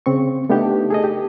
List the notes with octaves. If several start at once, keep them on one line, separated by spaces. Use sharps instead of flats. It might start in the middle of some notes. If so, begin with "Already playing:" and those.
C#3 C4 C#6
A3 B3 D4 D#4 G4
G#4 A4 D#5
G4